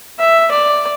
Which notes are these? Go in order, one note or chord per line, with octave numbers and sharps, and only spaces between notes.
E5
D5